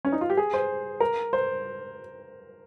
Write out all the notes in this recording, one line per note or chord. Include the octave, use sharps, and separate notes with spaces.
C#4
D#4
F4
G4
G#4
C5
A#4
C5